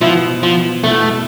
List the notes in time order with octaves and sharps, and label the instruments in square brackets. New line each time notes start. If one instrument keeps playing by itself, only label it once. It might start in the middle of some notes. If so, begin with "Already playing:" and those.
[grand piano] B2 B3 E4 [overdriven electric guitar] F3
[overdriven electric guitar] F3
[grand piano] B2 B3 E4 [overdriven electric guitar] A3